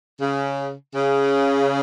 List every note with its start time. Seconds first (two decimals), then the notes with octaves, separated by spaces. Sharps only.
0.21 C#3
0.95 C#3